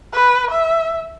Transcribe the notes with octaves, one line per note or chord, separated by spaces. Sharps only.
B4
E5